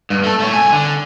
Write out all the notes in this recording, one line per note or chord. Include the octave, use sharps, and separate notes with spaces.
G2
A3 A4
A3 C#5
C2 G#5
D3